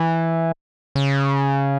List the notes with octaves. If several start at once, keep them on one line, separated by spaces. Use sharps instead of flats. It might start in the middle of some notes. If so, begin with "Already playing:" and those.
Already playing: E3
C#3